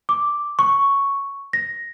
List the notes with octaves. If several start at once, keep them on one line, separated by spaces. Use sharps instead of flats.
D6
C#6
A#6